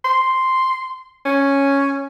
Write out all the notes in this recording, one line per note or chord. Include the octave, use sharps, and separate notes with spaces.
C6
C#4